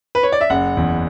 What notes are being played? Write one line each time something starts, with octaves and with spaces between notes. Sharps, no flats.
B4
C#5
D5
E5
F#1 F#5
E2